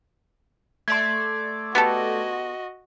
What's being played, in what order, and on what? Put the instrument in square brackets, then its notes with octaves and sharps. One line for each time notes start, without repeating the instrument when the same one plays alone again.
[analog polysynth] A3 D5 [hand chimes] C6 G#6
[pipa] B3 G4 A4 [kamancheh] F#4 D#5